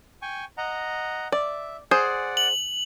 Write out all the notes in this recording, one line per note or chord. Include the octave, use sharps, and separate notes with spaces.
G5 G#5 C#6
D#5 F#5 A#5
D5 E5
G#4 C5 D5 F#5
F#7